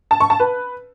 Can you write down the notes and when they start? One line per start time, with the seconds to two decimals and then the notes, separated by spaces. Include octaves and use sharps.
0.11 A5
0.20 C#6
0.30 A5
0.40 B4